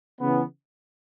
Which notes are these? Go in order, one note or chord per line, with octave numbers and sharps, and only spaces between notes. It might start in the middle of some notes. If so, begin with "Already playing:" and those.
C#3 E3 B3